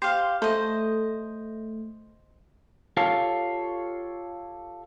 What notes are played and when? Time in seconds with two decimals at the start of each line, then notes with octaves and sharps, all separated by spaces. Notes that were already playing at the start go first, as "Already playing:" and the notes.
0.02 G4 C5 F5
0.42 A3 C5 D#5
2.97 F4 G4 A4 C#5 F5